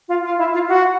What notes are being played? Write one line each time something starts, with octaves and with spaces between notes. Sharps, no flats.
F4
F4
E4
F4
F#4